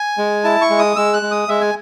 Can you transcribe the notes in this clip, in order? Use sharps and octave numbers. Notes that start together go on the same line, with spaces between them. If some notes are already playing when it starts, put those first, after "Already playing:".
Already playing: G#5
G#3
E4 A5
C#6
G#3
D#6
G#3 E6
F#6
G#3
D#6
G#3 E5
G#5